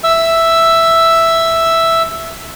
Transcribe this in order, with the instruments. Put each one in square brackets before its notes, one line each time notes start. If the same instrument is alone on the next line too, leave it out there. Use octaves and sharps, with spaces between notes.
[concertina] E5 E6